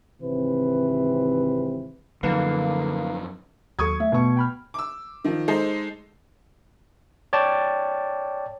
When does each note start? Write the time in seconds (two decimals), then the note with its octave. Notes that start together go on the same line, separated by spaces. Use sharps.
0.21 G#1 C3 E3 C4 B4
2.23 F#2 D3 F3 A#3 D#4 B4 F5
3.79 D#2 F#3 A4 C#6 D#6 G#6
4.00 A3 E5
4.12 B2 C#6
4.37 G5 B5 F6
4.74 D6 E6
5.24 D#3 F3
5.48 G#3 D#4 A4 C5
7.33 C#5 D5 G5 A5